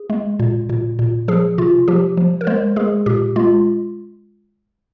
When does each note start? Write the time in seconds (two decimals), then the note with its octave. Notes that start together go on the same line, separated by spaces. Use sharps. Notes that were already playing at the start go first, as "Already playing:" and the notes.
Already playing: G#4
0.10 G#3
0.39 A#2
0.69 A#2
0.99 A#2
1.28 F3 G#4
1.58 C3 F4
1.88 F3 G4
2.17 F3
2.41 A#4
2.47 G#3 C5
2.76 G#3 G#4
3.06 A#2 G4
3.36 G#3 F4